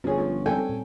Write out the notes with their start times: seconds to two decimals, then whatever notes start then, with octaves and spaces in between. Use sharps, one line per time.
0.04 G1 F3 C#4 G#4 C#5
0.18 F3
0.46 G3 C4 A4 G5 G#5
0.69 A#2